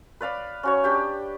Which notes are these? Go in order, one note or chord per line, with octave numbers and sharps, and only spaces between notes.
B4 D5 F5 B5
C#4 F#4 C#5
D4 G4 G5